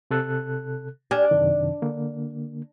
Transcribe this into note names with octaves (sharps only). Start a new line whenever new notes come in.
C3 A4 F#6
D4 G4 G#5 F6
F#2 C3 D#3
D3 A#3